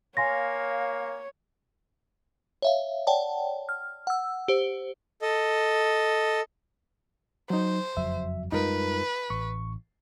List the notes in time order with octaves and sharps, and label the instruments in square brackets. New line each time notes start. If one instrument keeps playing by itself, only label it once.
[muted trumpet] A#3 [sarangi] C#5 [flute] F5 [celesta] G#5 C6 A#6
[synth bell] C#5 E5 F5
C#5 D5 F#5 G5 A5
F6
F#5 E6
G4 C5
[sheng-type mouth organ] A4 D#5
[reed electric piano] F#3 D#4 [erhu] C5
[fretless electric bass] F#1 F2 F#3 [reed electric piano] E5
[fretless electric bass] F#2 G3 G#3 [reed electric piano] D#4 F4 A#4 [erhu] B4
[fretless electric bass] A1 [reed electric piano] C#6